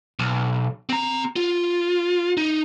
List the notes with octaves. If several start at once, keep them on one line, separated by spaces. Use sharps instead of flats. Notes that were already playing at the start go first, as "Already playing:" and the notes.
B1
C4 A#5
F4
D#4